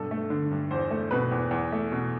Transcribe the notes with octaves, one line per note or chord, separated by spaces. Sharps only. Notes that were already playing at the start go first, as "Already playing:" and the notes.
Already playing: G2 B2 A4
A3
D3
G2
E2 C5
A3
B2 B4
E2
E2
A3
B2